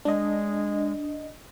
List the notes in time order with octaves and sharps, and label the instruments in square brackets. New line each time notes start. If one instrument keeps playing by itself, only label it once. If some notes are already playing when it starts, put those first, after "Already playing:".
[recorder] G#3 [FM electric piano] D4 D#5